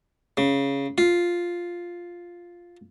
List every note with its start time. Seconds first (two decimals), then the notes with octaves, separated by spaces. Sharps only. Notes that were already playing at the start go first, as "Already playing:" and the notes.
0.37 C#3
0.98 F4